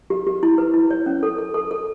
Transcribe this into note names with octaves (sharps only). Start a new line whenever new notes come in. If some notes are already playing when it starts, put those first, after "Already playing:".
G4
G4
E4
B4
E4
C#5
C#4
A4
A4
A4
A4